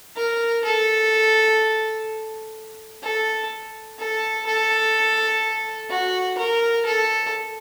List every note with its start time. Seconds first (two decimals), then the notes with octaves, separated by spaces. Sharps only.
0.16 A#4
0.65 A4
3.03 A4
3.99 A4
4.47 A4
5.90 F#4
6.37 A#4
6.86 A4